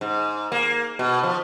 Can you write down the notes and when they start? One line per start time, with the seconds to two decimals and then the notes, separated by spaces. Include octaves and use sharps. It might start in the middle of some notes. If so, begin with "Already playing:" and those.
0.01 G#2
0.52 A#3
0.99 B2
1.23 F3